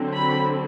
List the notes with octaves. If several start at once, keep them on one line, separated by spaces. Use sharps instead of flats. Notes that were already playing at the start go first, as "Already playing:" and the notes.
Already playing: D3 F#3 C4
B5